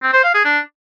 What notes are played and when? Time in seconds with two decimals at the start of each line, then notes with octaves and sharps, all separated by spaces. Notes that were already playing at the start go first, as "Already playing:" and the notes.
0.02 C4
0.13 C5
0.24 F5
0.34 G#4
0.45 D4